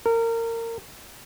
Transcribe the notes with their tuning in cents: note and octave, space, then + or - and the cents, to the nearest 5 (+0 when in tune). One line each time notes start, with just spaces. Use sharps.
A#4 -25